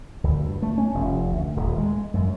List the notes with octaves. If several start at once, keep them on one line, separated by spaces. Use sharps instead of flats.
D2
G2
A3
C#4
F1
D2
D#1
G#3
F#2